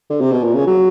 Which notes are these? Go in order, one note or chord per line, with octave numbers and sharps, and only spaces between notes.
D3
C3
B2
A#2
C#3
F#3